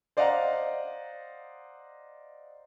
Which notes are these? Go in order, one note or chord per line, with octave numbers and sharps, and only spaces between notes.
C5 D5 D#5 F5 F#5 A#5